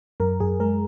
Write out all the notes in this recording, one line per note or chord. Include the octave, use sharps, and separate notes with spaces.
F#2 A#4
F#2 G#4
G#3 A#4